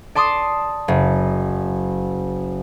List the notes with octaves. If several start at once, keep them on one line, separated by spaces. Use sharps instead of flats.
D5 A5 C6 D6 D#6
F#1